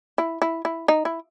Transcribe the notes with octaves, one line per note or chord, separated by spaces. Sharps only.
E4
E4
E4
D#4
E4